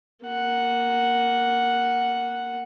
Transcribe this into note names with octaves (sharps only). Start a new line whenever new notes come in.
A#3 F#5